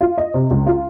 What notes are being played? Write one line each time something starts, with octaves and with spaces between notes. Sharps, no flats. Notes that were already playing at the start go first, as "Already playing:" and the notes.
F4
D#5
C3
C#2
F4